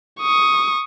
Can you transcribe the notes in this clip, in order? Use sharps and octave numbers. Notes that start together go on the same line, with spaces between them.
C#6 D#6